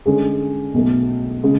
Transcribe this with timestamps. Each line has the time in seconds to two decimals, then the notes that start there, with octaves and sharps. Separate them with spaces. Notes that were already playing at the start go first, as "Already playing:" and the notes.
0.06 D3 G#3 C#4 G#4
0.74 B1 B2 F#3 A3
1.44 C#3 G#3